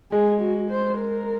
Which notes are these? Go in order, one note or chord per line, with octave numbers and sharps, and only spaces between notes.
G#3 G#4
F#4
C5
A#4